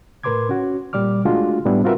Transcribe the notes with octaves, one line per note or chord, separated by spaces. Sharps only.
A2 A#4 B4 C6 D6 G#6
C#4 F#4
A#2 G3 D5 D6 F6
G#3 A3 D4 F4 F#4
A2 G3 B3 D4 E4
C4 F4 F#4 A#4 B4 E5